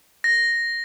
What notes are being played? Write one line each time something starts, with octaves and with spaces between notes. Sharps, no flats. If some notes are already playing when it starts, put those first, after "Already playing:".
A#6